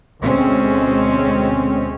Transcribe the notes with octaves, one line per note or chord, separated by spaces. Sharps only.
D2 B2 G#3 C4 C#4